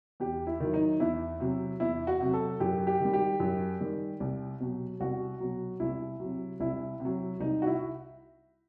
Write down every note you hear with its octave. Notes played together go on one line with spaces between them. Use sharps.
E2 G4
E4
D#3 F#3
D#4
E2 E4
C3 F#3
E2 E4
F#4
C3 F#3
A4
F#2 G4
G4
D#3
G3
G4
F#2
D#3 G3
C2
B2 F#3
C2 F#4
B2 F#3
C2 E4
C3 F#3
C2 E4
C3
F#3
C2 D#4
F#4
E4